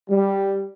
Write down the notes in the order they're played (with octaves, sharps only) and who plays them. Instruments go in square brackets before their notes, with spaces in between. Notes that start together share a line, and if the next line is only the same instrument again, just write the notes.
[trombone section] G3